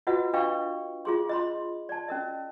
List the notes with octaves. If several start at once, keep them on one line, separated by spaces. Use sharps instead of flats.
F4 F#4 B4 D#5 F#5
D4 B4 D#5 F5 G5 C#6
F4 G#4 C6
D#5 B5 C6
D5 A5
C#4 A#4 D#5